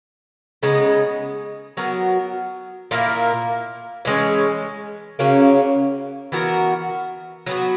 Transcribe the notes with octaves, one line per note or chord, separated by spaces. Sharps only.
C#3 G#3 B3 D#4
F#3 B3 F#4 A#4
A#2 A#3 E4 A#4
E3 G#3 C#4
C#3 F#3 A#3 C#4
E3 B3 F#4 A#4
F#3 B3 F#4